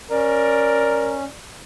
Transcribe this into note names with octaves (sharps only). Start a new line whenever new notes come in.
C#4 A#4 D5